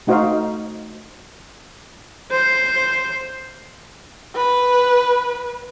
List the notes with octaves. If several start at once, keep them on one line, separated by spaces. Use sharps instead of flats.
A3 D#4 F#4 C5 D#5 F5
C5
B4